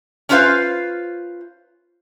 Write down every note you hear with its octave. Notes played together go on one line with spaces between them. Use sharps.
C#4 D4 F4 B4 C5 F5